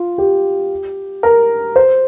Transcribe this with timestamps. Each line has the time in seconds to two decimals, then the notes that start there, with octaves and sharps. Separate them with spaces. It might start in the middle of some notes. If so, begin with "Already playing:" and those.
Already playing: F4
0.18 G4
1.23 A#4
1.76 C5